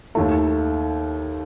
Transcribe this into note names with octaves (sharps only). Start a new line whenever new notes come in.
D#2 D#3 A3